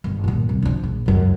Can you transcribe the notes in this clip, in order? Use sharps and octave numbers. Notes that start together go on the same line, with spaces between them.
G1
D#2 A#2
C2
F3 D4
A#1
C#2 F#2